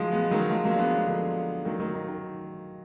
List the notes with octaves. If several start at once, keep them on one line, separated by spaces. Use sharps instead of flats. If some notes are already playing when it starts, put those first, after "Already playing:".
Already playing: D#3 F3 F#3 G#3
G#3 B3
D#3 F#3
F3 G#3
F#3 A#3
D4
G#3 B3
F3 G#3
D3 F3
D#3 F#3
D#3 F#3
D#3
D#3